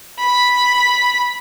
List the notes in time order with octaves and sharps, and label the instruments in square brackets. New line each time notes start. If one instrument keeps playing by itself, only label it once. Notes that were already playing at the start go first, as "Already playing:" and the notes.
[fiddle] B5